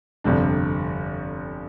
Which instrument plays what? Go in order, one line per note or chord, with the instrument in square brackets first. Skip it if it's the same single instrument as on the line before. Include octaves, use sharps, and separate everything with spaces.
[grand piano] G1 F2 C3 G3 D4